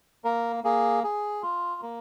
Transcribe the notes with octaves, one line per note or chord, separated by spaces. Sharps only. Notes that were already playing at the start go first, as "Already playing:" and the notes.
A#3 A#4
A#3 G#4
G#4
F4
A#3